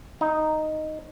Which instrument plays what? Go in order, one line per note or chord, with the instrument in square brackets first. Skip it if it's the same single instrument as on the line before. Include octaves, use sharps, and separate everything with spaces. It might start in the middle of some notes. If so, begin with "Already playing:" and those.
[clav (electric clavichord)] D#4